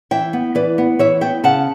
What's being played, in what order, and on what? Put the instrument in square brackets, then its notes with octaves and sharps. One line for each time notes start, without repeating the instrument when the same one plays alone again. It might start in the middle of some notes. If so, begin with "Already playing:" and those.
[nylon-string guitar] E3 E5 G5
B3
E3 B4 D5
B3
E3 C#5 E5
B3 E5 G5
C#3 F#5 A5